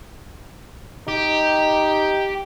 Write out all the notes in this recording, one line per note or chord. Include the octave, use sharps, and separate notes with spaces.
D#4 G4